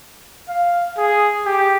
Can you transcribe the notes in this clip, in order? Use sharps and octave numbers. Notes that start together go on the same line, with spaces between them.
F5
G#4
G4